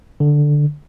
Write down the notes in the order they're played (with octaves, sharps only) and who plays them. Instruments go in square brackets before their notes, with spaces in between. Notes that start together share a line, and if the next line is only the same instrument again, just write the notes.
[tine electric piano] D3